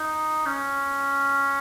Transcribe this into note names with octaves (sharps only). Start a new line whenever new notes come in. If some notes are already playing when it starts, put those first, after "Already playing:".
Already playing: D#4
C#4